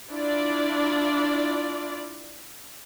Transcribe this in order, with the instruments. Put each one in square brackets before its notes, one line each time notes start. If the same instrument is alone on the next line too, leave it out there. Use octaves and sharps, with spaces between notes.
[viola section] D4 E4 F4 D5